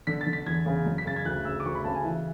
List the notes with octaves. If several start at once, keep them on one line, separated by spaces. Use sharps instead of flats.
D3 B6
A6
D3
B6
E2 G#6
C#3
F#2
B6
C#3 A6
G#6
D2 F#6
C#3 E6
D6
D2 C#6
B5
C#3 A5
G#5
E3 E5